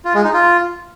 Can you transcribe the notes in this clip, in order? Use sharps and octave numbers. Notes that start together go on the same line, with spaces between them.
F4
G#3
D#4
F4